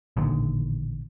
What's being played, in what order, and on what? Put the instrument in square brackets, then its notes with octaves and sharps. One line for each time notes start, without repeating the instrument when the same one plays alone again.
[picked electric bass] A1 A#2 D3 D#3